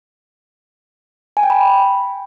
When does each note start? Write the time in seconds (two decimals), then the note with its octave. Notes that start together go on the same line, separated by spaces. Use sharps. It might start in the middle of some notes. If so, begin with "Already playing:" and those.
1.37 G#5
1.43 G5
1.50 B5